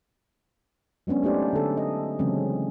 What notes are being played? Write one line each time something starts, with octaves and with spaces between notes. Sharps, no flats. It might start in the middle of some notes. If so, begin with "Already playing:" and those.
F#3 G#3 B3 C#4 D4
A3 D4 D#4 G4 C5 D5
D3 A4
D#5
C#3 E3 F#3 G#3 C4 C#4